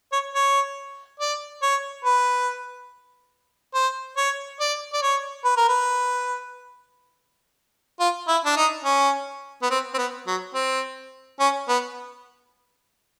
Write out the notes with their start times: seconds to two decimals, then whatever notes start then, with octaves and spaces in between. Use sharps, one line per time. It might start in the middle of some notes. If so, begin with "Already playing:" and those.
0.12 C#5
0.35 C#5
1.20 D5
1.62 C#5
2.05 B4
3.75 C5
4.17 C#5
4.60 D5
4.93 D5
5.02 C#5
5.44 B4
5.57 A#4
5.68 B4
8.00 F4
8.28 E4
8.45 D4
8.57 D#4
8.85 C#4
9.62 B3
9.70 C4
9.94 C4
9.98 B3
10.27 F#3
10.54 C4
11.40 C#4
11.68 B3